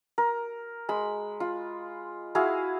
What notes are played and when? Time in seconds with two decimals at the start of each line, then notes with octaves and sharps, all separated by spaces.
0.18 A#4
0.89 G#3 B5
1.40 F4
2.35 E4 F#4 G#4 F5